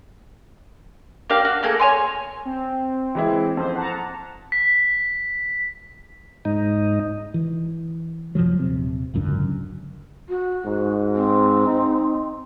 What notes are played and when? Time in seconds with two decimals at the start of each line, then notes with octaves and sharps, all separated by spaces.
1.30 A#3 D4 G4 F5
1.45 F#4
1.63 A3 A#3 G#4 A4
1.80 C#5 G#5 C6
2.45 C4
3.15 E3 G#3 E4
3.57 F2 C5
3.75 F#5 A5 A#5
4.52 B6
6.45 G#2 D#4
7.34 E3
8.35 F#1 C3 F3 F#3
8.59 D#1 C3
9.14 G#1 C#2 F#2 D3
10.29 F#4
10.65 G#2
11.15 C4
11.67 D#4